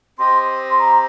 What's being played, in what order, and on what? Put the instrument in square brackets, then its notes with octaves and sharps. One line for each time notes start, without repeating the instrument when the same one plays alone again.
[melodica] C4 G4 D#5 [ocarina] C6
[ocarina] C6
A#5